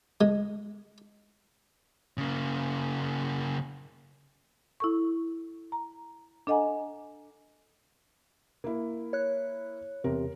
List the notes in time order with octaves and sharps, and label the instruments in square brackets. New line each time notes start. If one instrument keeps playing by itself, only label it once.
[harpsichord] G#3
[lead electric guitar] C#3 A#3
[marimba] E4 A4 C#6
A#5
D4 A4 D#5 F#5 G#5 A#5
[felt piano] A#3 E4
[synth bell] C#5 F#6
[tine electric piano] E2 C3 [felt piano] A#4